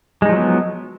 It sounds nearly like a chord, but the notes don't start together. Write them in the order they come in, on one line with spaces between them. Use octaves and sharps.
G#3 D#4 F3 F#3 B3